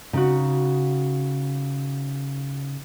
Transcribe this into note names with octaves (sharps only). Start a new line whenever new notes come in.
C#3 D#4 F#4